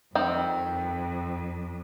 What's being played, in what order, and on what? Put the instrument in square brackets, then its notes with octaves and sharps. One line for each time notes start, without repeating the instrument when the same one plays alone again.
[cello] F2 [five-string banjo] D#3 C4